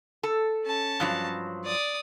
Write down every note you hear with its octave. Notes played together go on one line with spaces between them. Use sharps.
A4
C#4 A5
G2 F3 F#3
D5 D#6